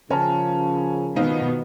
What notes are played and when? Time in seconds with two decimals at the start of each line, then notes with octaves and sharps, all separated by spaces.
0.10 C#3 F3 C#4 A#4 A5
1.16 B2 D#3 B3 C4 D#4 F4